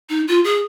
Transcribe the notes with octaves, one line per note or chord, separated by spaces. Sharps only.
D#4
F4
G#4